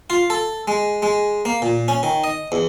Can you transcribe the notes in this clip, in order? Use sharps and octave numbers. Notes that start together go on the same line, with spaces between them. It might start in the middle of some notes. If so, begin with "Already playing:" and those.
F4
A4
G#3
G#3
A#3
A#2
C#4
D#3
D#5
E2